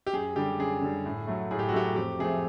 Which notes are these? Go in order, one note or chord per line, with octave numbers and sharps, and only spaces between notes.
G4
F#2 G#4
D3 G3 G4
F#2 G#4
D3 G3
A2
F#3 A3
A2 G#4
G4
F#4
F#3 A3 G4
F2 G4
C3 F3 A3 G#4